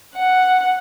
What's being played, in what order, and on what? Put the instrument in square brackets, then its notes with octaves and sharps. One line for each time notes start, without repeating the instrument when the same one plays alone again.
[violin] F#5